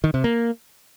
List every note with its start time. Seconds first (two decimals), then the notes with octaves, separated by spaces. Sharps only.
0.04 D#3
0.14 C3
0.24 A#3